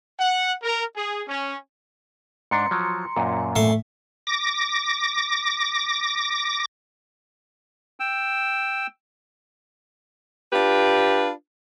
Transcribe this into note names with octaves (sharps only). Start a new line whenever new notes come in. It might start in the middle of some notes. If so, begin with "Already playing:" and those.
F#5
A#4
G#4
C#4
G#2 D4 A#5 C6 C#7
F3 F#3
F#2 A#2
A2 A3 C6
D6 A#6
G5 E6
D4 F4 G4 B4